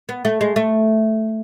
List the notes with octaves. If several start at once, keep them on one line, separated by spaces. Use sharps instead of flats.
B3
A3
G#3
A3